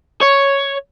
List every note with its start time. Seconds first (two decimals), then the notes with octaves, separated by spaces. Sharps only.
0.23 C#5